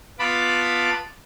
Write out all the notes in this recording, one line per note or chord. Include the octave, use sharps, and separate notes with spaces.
B3 F4 A5 B5 D6